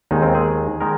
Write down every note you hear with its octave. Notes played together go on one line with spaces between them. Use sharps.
D#2 D#3 G#3 D#4
C4
G#4
D#3 G#3 A#4